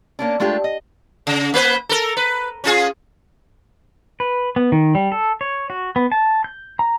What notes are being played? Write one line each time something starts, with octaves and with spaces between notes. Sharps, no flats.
A#3 C#4 D4
G#3 A3 D4 F4 G4
D#5
C#3
A#3 B4 C5
A4 A#4
B4
C#4 F4 G#4
B4
B3
D#3
G3
A4
C#5
F#4
B3
A5
G6
A#5